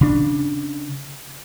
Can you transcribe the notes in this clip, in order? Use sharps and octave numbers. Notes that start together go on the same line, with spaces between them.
C#3 D4